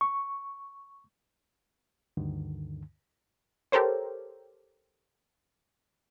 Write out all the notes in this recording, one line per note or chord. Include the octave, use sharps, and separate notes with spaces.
C#6
D2 G2 D3 D#3
G4 A4 A#4 C5 C#5